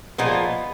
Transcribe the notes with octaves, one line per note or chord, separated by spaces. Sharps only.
A#2 F3 G#3 B3